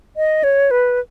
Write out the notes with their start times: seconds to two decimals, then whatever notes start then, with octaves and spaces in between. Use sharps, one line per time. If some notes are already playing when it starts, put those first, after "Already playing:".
0.17 D#5
0.44 C#5
0.71 B4